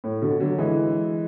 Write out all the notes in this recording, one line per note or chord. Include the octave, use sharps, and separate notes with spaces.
A2
B2 D3
D3 F#3
E3 G#3